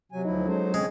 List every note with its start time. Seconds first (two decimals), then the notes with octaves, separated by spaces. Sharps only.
0.12 C3 F#3 G#5
0.25 D2 F3 D#4 E4
0.48 G#3 C#4 D#4 A4 C5
0.74 D3 G#3 C4 C#4 G#5